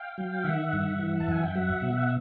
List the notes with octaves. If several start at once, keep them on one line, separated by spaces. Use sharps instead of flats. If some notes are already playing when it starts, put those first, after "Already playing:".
Already playing: F5 G5
F#3
D#3 E5 F#5
G2
E3
A5
F#2 G#5
G5
F#3 E5 F#5
B2
F#5